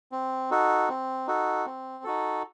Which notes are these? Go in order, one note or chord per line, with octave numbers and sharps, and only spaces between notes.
C4
D#4 F#4 A4
C4
D#4 F#4 A4
C4
D#4 F#4 A4